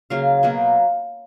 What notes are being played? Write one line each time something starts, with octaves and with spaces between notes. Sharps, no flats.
C#3 F#3 A#3 F5
B2 F#3 A#3